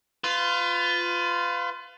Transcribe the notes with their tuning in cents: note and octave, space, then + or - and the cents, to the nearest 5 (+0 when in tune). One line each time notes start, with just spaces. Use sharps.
F4 +0 B4 +30